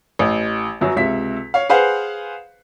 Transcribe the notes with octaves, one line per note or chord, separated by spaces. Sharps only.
A1
G1 F#2 F#3
C#2 C3 E5 B6
C#5 F5
G#4 B4 C5 F5 F#5